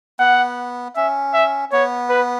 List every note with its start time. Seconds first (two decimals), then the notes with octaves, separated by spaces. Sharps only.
0.19 B3 F#5
0.96 C#4 E5
1.34 E5
1.72 B3 C#5
2.10 B4